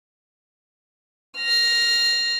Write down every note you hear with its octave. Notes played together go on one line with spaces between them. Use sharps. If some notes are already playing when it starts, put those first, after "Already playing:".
F6 A#6